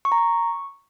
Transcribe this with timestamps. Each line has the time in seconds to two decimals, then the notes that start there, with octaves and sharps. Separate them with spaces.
0.05 C#6
0.12 A#5
0.18 C#6